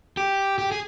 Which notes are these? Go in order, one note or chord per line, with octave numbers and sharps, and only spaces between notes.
G4
G4
G#4